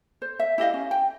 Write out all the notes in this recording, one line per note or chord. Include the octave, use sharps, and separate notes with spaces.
C5
E5
E4 G4 D#5 F5
C#4
G5